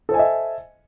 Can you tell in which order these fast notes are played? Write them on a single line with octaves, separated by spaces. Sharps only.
A4 C5 G#5 D#5 E5